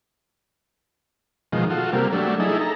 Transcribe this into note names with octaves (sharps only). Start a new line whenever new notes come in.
B2 D#3 F3 G#3
F4 F#4 A4
C3 G3 A#3
F#3 G3 A3 D4
D#4 E4 G#4 A4
A4 A#5